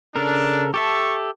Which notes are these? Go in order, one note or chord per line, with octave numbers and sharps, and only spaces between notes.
C#3 D4 A4 A#4
G4 A4 E5 A5 C#6